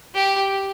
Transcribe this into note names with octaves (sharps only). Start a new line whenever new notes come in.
G4